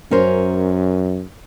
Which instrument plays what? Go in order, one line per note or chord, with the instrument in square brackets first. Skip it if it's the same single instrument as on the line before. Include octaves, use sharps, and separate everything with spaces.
[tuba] F#2 [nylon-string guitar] C#4 A#4 C5